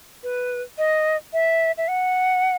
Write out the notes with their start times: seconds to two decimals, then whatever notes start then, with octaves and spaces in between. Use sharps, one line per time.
0.23 B4
0.78 D#5
1.33 E5
1.78 E5
1.88 F#5